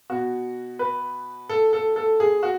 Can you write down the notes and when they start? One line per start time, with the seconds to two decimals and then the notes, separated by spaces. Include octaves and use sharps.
0.10 B2 F#4
0.79 B4
1.49 A4
1.73 A4
1.96 A4
2.20 G#4
2.43 F#4